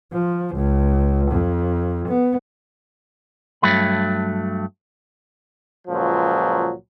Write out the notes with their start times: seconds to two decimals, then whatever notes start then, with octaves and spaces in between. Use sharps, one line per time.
0.13 F3
0.56 C#2
1.31 F2
2.08 B3
3.62 G2 F#3 A3 B5
5.88 C#2 A#2 F3 F#3